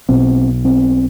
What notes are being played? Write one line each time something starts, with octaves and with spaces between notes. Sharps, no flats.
B1 B2 C4
C4